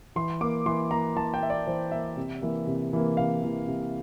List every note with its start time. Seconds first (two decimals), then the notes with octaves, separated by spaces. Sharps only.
0.16 E3 C6
0.41 A#3 D6
0.66 E3 C6
0.91 A#3 A#5
1.16 E3 A5
1.34 G5
1.42 A#3 E5
1.50 D5
1.67 E3 C5
1.91 A#3 E5
2.17 C3
2.42 E3 A#3
2.67 C3
2.93 E3 A#3
3.17 C3 F5
3.43 E3 A#3
3.67 C3